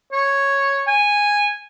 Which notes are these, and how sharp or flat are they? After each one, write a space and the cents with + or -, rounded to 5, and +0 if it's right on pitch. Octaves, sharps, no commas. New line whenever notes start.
C#5 -5
G#5 -10